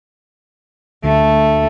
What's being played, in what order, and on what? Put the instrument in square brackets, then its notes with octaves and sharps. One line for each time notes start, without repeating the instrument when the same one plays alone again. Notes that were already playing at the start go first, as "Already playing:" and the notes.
[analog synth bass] D2 [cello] A3